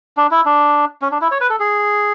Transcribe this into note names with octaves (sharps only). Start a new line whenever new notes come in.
D4
E4
D4
C#4
D4
E4
C#5
B4
A4
G#4